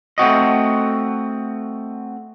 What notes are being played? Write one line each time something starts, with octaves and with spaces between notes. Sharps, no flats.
A3 C4 F#4 D#5